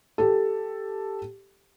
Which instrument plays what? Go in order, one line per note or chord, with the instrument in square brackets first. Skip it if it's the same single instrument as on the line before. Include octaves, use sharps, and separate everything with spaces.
[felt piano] G4 A4